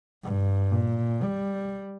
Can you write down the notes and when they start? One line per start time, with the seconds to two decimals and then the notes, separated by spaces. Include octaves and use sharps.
0.24 G2
0.72 A#2
1.22 G3